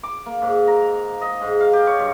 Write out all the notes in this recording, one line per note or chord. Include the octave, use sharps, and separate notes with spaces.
D6
A#3
G#2
A#5
D#5
G#2
F5
G4
C#5
G2